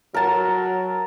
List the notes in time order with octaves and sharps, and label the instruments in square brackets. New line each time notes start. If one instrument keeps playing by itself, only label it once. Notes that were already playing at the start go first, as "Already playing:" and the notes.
[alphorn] F#3 [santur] A#4 A5